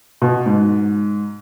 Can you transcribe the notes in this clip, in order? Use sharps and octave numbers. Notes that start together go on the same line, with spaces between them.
B2
G#2